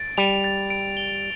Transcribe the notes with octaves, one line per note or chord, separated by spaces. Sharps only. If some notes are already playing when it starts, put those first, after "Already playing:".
Already playing: A6 D7
G3 F7
A6
D7
G7